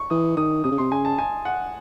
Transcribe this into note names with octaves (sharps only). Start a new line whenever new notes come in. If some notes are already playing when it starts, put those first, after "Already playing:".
Already playing: C#6
E3 D#6
D#3 D#6
C3 D#6
C#3
C3 C6
C#3 G#5
A5
G#5
F#5